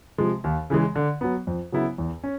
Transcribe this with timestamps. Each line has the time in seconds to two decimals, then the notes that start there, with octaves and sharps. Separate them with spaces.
0.18 C3 F3 G#3
0.44 D#2
0.70 C#3 E3 G#3
0.96 D3
1.21 F#3 B3
1.47 F2
1.72 C#3 F#3 B3 E4
1.98 E2
2.24 C#4